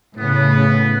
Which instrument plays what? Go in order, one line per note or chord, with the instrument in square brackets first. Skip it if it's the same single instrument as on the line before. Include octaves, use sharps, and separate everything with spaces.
[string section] A2 C#3 [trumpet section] B3